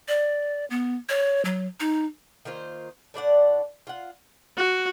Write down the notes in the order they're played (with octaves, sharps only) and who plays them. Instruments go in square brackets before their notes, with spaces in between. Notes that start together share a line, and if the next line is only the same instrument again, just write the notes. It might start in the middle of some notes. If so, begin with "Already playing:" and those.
[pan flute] D5
B3
C#5
F#3
D#4
[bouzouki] D#3 A#3 F4 C5
A2 D4 D5 F#5
F4 F#5
[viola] F#4